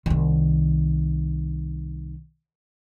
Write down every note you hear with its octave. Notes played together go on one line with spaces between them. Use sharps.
C2 D#3